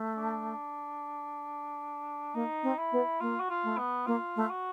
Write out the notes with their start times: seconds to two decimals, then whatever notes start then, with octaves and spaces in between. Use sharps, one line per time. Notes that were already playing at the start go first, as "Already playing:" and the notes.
Already playing: A3
0.17 D4
2.34 A#3 D#4
2.63 C4
2.78 E4
2.92 B3
3.20 A#3 F4
3.40 F#4
3.50 F4
3.63 A3
3.78 B3
4.06 A#3 F4
4.36 A3
4.50 F#4